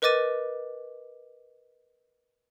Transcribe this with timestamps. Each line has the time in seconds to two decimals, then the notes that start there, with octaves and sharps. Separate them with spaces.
0.02 A#4 B4 D#5 D6 A6 D#7